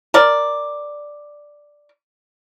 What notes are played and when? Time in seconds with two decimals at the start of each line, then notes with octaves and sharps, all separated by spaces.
0.14 A#4 D5